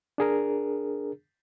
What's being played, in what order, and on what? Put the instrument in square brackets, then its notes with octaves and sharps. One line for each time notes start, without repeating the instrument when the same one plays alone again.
[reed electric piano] D4 G#4 A#4